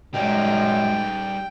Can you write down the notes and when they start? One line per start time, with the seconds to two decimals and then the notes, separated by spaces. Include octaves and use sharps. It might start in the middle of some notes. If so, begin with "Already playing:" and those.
0.14 F#2 G3 G#3 D#4 G5